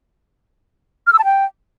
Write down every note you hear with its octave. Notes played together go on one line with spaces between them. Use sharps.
F6
E6
A5
G5